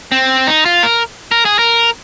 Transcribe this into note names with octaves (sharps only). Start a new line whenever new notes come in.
C4
D#4
F4
A#4
A#4
G#4
A#4